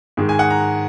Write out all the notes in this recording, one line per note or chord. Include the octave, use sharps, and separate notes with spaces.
G#2 D#3 G#3
G#5
F#5
A#5